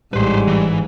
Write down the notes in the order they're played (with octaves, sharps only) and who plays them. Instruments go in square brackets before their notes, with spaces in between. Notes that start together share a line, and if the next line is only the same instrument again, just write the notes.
[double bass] A1 [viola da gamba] G#2 [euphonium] G3 [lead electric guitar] B4 C5
[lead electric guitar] E3